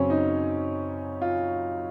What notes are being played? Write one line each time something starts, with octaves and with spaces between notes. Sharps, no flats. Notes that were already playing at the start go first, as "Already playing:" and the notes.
Already playing: F#2 C#3 F#3 C4 C#4
D#4
F4